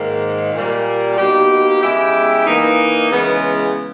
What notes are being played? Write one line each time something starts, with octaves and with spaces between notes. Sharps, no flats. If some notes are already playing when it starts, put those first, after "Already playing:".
Already playing: G#2 D#3 A#3
A#2 G3 A#3
B2 A#3 D#4 G4
C#3 G#3 B3 E4 G4
E3 A#3 D#4
C#3 E3 G#3 B3